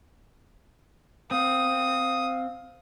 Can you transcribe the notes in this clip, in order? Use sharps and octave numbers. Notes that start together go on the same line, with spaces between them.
C4 F5 D#6